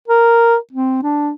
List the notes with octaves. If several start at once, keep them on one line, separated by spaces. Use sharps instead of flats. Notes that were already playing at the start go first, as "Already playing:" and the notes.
A#4
C4
D4